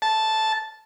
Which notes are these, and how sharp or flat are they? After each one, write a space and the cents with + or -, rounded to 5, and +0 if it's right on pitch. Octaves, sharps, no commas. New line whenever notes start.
A5 -5